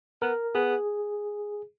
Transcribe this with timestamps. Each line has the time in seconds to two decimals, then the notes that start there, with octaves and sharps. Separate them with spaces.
0.22 B3 A#4
0.55 B3 G#4